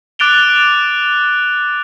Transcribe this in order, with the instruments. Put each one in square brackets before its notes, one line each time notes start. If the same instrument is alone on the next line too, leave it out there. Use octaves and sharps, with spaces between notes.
[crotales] D6 F#6 A6 D7 F7 G7